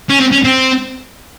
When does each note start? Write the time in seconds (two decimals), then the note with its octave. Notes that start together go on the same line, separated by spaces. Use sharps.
0.10 C#4
0.20 C4
0.32 C#4
0.45 C4